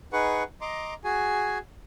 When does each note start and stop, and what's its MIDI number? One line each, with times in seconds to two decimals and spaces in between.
0.13 0.43 63
0.13 0.43 68
0.13 0.43 71
0.13 0.43 78
0.13 0.43 85
0.61 0.94 75
0.61 0.94 82
0.61 0.94 84
0.61 0.94 86
1.04 1.58 66
1.04 1.58 68
1.04 1.58 80